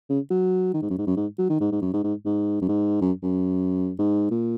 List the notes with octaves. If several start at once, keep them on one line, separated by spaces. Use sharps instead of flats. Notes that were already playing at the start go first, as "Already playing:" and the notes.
C#3
F#3
D#3
G#2
F#2
G#2
F#2
G#2
F#3
D#3
G#2
G#2
F#2
G#2
G#2
G#2
F#2
G#2
F#2
F#2
G#2
A#2